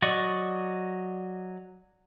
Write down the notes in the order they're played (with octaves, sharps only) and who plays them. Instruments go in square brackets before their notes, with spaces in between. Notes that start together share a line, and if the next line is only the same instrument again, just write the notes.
[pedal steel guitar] F#3 D5 D#5 C#6